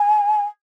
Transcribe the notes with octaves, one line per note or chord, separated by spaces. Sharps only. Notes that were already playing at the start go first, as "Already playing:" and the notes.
Already playing: G#5